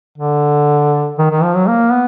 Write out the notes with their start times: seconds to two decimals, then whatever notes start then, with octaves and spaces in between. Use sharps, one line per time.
0.18 D3
1.18 D#3
1.30 D#3
1.43 F3
1.55 F#3
1.68 A#3
1.92 B3